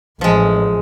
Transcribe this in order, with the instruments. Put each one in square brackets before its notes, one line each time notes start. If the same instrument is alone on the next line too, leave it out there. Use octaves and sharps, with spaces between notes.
[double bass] A1 [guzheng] F3 G#3